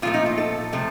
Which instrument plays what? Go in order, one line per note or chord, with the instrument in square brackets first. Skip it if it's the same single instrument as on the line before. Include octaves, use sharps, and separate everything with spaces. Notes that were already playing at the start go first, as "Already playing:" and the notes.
[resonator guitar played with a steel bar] A#2 F3 A3 F4
D#4
F4
A4
C3 F3 A3